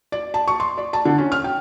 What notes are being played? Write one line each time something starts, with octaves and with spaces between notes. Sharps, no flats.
D5
A5
C#6
C6
D5
A5
D3
C#4
F6
G5